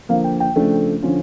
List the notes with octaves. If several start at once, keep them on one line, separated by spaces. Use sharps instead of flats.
D3 F3 A#3 F5
G5
G5
C#3 F3 A3 D4
D3 F3 C#4 F4